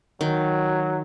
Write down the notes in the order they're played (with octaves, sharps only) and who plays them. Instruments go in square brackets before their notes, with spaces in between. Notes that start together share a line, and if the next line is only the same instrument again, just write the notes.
[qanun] D#3 [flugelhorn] F#3